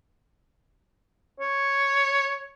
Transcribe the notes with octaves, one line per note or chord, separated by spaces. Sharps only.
C#5